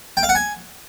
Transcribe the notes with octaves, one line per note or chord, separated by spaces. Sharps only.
G5
F5
F#5
G#5